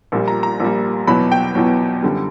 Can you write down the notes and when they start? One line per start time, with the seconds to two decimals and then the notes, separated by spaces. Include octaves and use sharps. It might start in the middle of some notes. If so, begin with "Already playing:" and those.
0.12 A#1 A#2 G3
0.28 A#5
0.43 A#5
0.60 A#1 A#2 G3
1.07 E2 B2 F#3 B5
1.32 G5
1.55 E2 B2 F#3
2.02 F#2 D3 G3